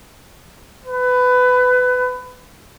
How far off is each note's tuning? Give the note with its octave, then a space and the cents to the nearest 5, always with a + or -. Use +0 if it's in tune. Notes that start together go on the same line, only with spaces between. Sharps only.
B4 +20